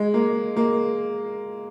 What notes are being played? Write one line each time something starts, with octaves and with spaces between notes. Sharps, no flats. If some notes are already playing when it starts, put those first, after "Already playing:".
Already playing: G#3
A#3
A#3